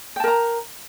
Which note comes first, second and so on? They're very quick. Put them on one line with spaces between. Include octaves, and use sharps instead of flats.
G5 A5 A#4 A#5